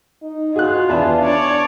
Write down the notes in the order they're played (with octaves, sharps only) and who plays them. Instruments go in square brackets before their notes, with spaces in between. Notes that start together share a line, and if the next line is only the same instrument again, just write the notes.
[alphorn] D#4
[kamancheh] F4 [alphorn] F#4 [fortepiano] G#4 F#6
[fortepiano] E2 B4 E5 [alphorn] D4
[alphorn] D4 [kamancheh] C#5 D5